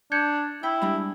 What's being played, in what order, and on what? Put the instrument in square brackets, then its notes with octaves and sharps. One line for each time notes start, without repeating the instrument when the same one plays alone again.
[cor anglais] D4 [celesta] G6 G#6 C#7
[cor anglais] E4 [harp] G5 B5
[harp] G3 G#3 D4 [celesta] B5